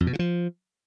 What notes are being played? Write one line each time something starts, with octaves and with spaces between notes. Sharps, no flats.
F2
B2
C#3
F3